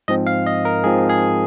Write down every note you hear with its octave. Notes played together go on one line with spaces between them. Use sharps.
G#2 F3 C4 D#5
F5
D#5
A#4
G#2 F3 C4 G#4
G#4